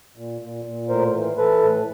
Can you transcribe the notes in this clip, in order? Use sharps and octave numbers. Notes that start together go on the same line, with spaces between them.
A#2
A#2
A#2
A2 A#4 C5
E3
E3 A4 B4
A2